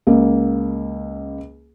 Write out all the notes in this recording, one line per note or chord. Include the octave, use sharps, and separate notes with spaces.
C#2 A#3